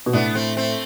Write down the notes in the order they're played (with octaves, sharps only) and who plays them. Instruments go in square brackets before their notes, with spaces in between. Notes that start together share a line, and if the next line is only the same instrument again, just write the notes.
[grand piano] B2
[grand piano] A2 [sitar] B3 D4
[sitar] A3 C4
A3 C4